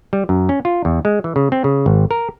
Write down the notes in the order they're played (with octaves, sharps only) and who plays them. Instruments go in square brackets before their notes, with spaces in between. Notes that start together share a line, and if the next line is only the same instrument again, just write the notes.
[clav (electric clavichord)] G3
F#2
C#4
F4
E2
G#3
E3
C#3
C4
C#3
G#1
A#4